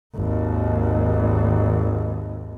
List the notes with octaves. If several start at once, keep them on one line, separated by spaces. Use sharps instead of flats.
G#1 D#2